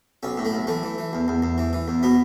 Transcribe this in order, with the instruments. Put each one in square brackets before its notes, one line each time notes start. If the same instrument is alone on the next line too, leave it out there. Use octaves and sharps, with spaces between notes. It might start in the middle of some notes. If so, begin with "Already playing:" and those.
[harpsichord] B1 C#4
A2
A3
B1
E3 A3
E3
E3
E2
E2
E2
E3
E3
E2
B2 B3